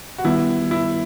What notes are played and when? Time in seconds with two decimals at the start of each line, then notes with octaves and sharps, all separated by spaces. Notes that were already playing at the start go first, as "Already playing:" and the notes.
0.18 F#4
0.24 D#3 G3 B3 E4
0.71 E4